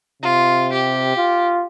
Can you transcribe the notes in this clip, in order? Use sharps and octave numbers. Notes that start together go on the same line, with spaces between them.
C3 F4
G4
F4